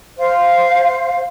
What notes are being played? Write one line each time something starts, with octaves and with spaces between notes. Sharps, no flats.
C5 F5